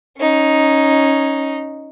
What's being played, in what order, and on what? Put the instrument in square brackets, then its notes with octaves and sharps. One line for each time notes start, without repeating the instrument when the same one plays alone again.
[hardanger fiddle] C#4 D#4